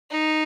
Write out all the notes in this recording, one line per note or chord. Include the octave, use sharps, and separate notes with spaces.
D#4